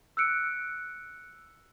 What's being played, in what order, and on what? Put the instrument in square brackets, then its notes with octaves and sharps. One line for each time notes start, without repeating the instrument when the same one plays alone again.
[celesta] E6 F#6 C#7 D7